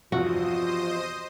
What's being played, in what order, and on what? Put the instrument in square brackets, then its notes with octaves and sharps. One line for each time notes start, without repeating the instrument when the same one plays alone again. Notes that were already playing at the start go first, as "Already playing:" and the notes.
[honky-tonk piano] E2 G2 C3 [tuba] F3 [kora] F#4 [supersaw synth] C5 D#5 D#6